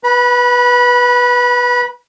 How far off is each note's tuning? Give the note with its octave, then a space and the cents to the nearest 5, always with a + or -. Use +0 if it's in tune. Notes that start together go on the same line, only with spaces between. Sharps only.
B4 -10 B5 -35